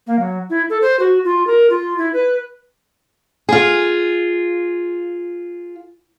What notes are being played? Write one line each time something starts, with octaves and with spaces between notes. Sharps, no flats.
A#3
F#3
E4
A4
C5
F#4
F4
A#4
F4
E4
B4
F4 G#4